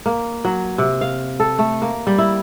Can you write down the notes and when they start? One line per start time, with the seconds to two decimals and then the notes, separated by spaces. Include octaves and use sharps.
0.06 A#3
0.45 F#3
0.78 C3
1.01 F5
1.40 A4
1.59 A3
1.82 A#3
2.07 G3
2.18 E4